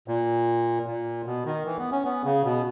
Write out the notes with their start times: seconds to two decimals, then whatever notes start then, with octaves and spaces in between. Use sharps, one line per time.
0.08 A#2
0.86 A#2
1.26 B2
1.45 D#3
1.65 E3
1.79 B3
1.92 C#4
2.05 B3
2.25 C#3
2.44 B2